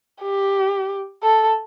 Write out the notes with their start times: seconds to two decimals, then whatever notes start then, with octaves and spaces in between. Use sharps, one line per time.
0.22 G4
1.23 A4